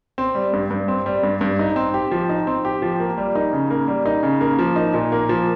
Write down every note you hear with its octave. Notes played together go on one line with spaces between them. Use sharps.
C4
G3
G2
G2
C4
G3
G2
G2
D#4
C4
G4
F3
D#4
C4
G4
F3
A#3
G3
D#4
C#3
A#3
G3
D#4
C#3
A#3
F3
D#4
A#2
A#3
F3